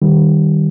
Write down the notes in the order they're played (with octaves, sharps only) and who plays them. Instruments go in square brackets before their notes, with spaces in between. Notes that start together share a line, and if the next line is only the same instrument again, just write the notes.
[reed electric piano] D#3 G3